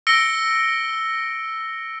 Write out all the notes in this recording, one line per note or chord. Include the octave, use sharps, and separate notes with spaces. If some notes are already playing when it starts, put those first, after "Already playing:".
E6 A#6 C#7 D7 G7